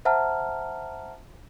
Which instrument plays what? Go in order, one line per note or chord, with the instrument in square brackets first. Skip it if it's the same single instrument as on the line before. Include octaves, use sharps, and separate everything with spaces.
[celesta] C5 E5 F#5 A5 A#5 F6